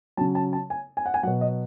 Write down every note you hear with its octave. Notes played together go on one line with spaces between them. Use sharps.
C#3 F#3 A5
A5
A5
G#5
G#5
F#5
G#5
B2 F#3 F#5
D#5